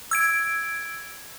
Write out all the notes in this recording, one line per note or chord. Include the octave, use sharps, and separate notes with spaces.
E6 G#6 D7